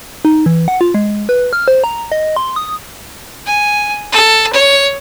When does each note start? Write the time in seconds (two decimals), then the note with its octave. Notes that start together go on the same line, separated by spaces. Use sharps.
0.25 D#4
0.46 E3
0.68 F#5
0.81 F4
0.94 G#3
1.29 B4
1.53 F6
1.68 C5
1.84 A#5
2.12 D#5
2.36 C6
2.56 D#6
3.46 G#5
4.12 A4
4.53 C#5